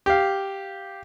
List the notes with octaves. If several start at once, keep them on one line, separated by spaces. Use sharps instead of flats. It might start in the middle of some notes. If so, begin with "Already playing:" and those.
G4 F5